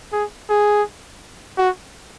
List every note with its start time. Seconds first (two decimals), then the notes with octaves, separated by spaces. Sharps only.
0.13 G#4
0.50 G#4
1.58 F#4